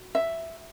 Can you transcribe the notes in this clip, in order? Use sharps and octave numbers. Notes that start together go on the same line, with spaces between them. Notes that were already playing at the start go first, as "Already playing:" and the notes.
Already playing: F#4
E5